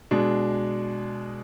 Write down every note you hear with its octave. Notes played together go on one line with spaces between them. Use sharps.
B2 G#3 D4